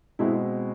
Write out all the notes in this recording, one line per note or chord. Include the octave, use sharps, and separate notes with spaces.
B2 G#3 C4 E4